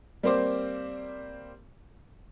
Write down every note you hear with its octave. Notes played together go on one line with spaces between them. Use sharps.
G3 A#3 C4 C5 D6